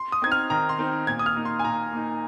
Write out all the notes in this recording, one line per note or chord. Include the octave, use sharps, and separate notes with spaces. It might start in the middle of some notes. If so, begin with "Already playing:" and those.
Already playing: C6
D#6
C4 D#4 G#6
F6
D#3 A#5
C6
C4 D#4
A#2 G#6
D#6
F6
A#3 D#4
C6
G#5
A#2 A#5
A#3 D#4